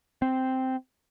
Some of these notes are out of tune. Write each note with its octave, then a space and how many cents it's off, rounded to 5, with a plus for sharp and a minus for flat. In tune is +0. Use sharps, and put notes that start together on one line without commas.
C4 -5